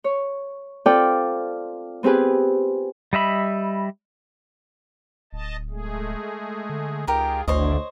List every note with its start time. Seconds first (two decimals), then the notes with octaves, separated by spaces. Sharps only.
0.04 C#5
0.86 C4 F4 A4 D5 F5 G5
2.03 B3 C4 G4 G#4 B4
3.13 G3 D#5 E5 B5
5.33 D1 D#5 A5
5.70 G#3 A3 G#4
6.69 D3
7.07 C#2 D#4 F4 G4 G#4 A#4
7.48 G#1 D2 D3 D4 E4 C5 C#5 D#5